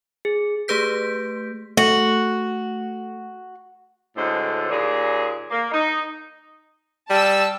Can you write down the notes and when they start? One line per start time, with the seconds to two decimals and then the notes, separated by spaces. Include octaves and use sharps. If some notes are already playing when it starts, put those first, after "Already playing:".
0.25 G#4
0.68 A3 G4 G#4 B4 G6 B6
1.77 A3 F#4
4.16 D2 A2 G#3 A4 C5
4.71 D#2 A#2 G#4
5.51 A#3
5.72 D#4
7.10 G3 A5 E6